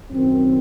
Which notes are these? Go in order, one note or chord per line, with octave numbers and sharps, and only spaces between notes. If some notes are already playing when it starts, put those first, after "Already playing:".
F#2 D#3 C4